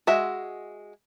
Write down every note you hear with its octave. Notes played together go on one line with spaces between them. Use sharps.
G#3 F#4 E5